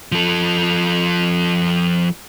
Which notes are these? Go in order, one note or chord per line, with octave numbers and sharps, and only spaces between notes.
F3 A4